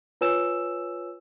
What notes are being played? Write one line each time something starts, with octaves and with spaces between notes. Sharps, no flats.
F4 B4 C#5 G#5 E6 E7